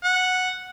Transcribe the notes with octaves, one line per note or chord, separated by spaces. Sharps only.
F#5